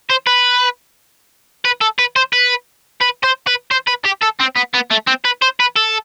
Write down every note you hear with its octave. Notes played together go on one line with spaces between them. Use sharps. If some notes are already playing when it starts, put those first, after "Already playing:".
C5
B4
B4
A4
B4
C5
B4
B4
C5
B4
C5
B4
G4
A4
C4
B3
B3
A3
C4
B4
C5
B4
A4